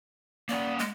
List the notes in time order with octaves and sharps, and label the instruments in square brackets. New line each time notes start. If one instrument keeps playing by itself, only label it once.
[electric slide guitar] A#3 C#4 F#5 [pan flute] D5
[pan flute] G#3